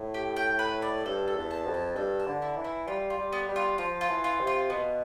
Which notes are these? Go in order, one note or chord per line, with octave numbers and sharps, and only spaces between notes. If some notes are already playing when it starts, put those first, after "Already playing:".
Already playing: A2
G4
G5
B4
D5
G2 A4
A4
E2
A5
F2
A5
G2 A4
A5
D3
E4
E3
E4
G3 F4
F4
G3
B3
G3
F4
F3 F4
F4
E3
F4
C3
F4
B2 B3